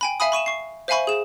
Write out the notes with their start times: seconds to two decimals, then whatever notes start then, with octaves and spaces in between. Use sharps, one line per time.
0.01 G5 G#5 B5
0.20 E5 F5 G#5 B5 D#6
0.32 B5 C#6 D#7 E7
0.46 C#6 C7
0.88 C5 E5 F5 G#5 B5 C#6
1.07 G#4 E7